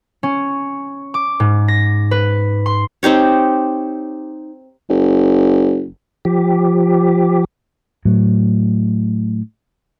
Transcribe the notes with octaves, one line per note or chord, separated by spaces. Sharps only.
C#4
D6
G#2
A#6
B4
C6
C4 D#4 G4 C#5
F#1
F3 G4
A2 F#3